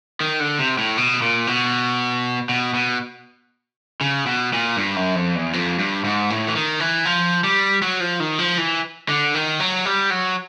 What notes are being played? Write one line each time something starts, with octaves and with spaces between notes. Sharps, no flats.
D#3
D3
C3
A2
B2
A#2
B2
B2
B2
C#3
B2
A#2
G2
F#2
F2
E2
F2
G2
G#2
A2
E3
D#3
E3
F3
G3
F#3
F3
D#3
F3
E3
D3
D#3
F#3
G3
F#3